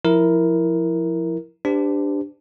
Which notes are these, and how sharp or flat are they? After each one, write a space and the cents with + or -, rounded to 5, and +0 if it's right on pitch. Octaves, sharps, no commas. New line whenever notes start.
F3 +0 E4 +0 A#4 +5
D4 +0 G4 +10 C5 -45